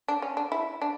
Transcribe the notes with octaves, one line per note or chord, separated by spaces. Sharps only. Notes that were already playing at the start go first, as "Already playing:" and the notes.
D4
C#4
D4
E4
D4